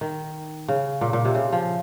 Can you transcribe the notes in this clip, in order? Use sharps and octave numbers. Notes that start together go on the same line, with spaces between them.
D#3
C#3
A#2
A#2
C3
C#3
F3